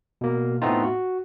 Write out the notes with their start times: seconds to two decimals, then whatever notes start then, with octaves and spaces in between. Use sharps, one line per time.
0.21 B2 A#3
0.62 A2 A3 B3 C4 D#4 F4
0.84 F#4